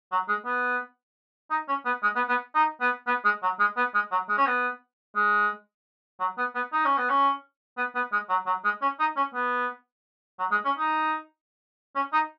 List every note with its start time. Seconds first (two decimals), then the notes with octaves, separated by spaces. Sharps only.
0.12 F#3
0.28 G#3
0.45 B3
1.50 D#4
1.68 C#4
1.85 B3
2.03 G#3
2.15 B3
2.29 B3
2.55 D#4
2.80 B3
3.07 B3
3.25 G#3
3.42 F#3
3.59 G#3
3.77 B3
3.94 G#3
4.11 F#3
4.28 G#3
4.38 C#4
4.46 B3
5.16 G#3
6.20 F#3
6.38 B3
6.55 B3
6.72 D#4
6.84 C#4
6.97 B3
7.09 C#4
7.77 B3
7.95 B3
8.12 G#3
8.29 F#3
8.46 F#3
8.64 G#3
8.82 C#4
8.99 D#4
9.16 C#4
9.34 B3
10.39 F#3
10.51 G#3
10.65 C#4
10.77 D#4
11.95 C#4
12.13 D#4